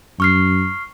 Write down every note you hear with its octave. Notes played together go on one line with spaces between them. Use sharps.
F#2 C#6 F6 C7